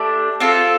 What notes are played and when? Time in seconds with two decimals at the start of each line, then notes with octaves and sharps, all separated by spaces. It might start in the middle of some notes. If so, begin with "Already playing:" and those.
Already playing: A3 D4 G4
0.40 C4 F4 A4